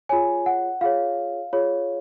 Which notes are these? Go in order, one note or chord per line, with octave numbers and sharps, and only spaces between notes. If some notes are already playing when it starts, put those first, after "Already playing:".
F4 G#4 C#5 G#5
F#5
F4 G#4 C#5 F5
F4 G#4 C#5